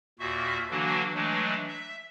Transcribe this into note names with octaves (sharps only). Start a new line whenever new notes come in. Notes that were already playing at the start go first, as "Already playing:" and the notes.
D#2 A#2 F#4 E5
D3 E3 F#3 A#3 D4 F#4
E3 F#3 G#3 A3 D4
E5